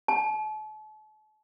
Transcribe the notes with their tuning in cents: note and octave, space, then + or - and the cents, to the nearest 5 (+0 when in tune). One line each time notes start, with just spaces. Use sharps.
A5 -40